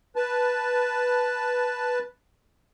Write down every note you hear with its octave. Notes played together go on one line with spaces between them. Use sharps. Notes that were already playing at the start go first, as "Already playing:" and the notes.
B4 A5